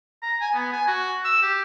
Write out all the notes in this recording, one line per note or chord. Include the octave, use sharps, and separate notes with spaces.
A#5
G#5
B3
G#5
F#4
E6
G4